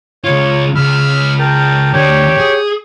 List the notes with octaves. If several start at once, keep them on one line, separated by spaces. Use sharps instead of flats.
C#2 F4 C#5
C#2 B5 E6 F6
A#4 G5 A5
D2 D4 G4 C#5 G5
G#4